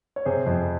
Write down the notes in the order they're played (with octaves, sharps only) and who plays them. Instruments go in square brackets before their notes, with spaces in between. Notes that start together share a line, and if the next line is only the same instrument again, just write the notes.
[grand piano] C#5
C3 G#4 C5
F2